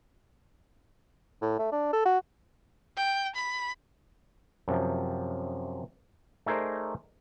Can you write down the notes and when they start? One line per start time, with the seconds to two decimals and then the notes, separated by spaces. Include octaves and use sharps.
1.42 A2
1.59 A3
1.72 D4
1.93 A4
2.05 F#4
2.97 G5
3.36 B5
4.68 F#2 C3 F3
6.46 A3 D#4 G#4 A#4 C5 D5